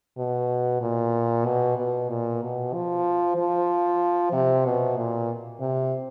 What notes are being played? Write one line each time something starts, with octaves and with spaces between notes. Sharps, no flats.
B2
A#2
B2
B2
A#2
B2
F3
F3
C3
B2
A#2
C3